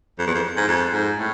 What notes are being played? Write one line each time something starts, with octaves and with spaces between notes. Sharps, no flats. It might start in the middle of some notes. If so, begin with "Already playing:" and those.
F2
E2
F2
G#2
F2
G#2
A2